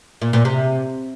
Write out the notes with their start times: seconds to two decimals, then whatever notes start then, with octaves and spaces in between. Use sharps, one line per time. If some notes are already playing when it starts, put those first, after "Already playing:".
0.22 A#2
0.33 A#2
0.45 C3